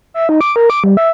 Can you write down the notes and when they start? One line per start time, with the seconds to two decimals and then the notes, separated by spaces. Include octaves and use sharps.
0.14 E5
0.29 D#4
0.41 D6
0.56 A#4
0.70 D6
0.84 G3
0.97 E5